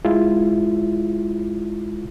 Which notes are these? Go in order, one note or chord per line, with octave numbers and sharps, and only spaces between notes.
G#3 E4 F4